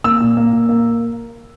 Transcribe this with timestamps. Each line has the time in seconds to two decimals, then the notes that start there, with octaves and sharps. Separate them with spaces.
0.04 A#3 E6
0.20 A#2
0.37 A#3
0.53 A#2
0.69 A#3